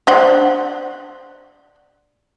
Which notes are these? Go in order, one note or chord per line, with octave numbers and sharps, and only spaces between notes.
D4 C5 F#5